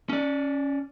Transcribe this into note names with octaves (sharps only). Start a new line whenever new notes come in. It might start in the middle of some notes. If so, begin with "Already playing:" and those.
C#4 D5